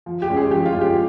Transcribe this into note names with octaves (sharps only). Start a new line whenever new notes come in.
F3
G4
G#3 C#4
G#4
F3 G4
F4
G#3 C#4
G4